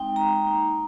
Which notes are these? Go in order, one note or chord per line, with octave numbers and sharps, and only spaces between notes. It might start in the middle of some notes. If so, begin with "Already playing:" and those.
Already playing: G#3 C4 D#4 G5
G#3 C4 D#4 A#5
A#3 D#4